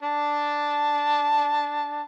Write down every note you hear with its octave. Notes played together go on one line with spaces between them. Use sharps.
D4 A5